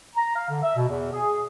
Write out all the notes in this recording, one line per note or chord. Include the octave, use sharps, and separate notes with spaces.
A#5
F5
D3
E5
B2
E2
G#4